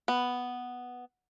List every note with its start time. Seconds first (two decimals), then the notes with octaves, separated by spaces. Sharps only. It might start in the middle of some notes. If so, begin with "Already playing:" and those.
0.08 B3